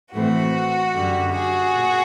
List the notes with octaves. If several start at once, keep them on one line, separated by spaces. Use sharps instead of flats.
A2 E3 A3 C4 F#4
F#2 D3 G3
F#4 G#4
A#2